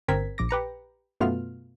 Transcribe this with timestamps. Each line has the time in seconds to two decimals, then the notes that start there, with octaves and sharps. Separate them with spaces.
0.08 G1 C4 A#4 G#6 B6
0.38 A#1 D6 A#6
0.49 G4 B4 A#5 C#7
1.21 F#2 B2 A3 B3 F4 F6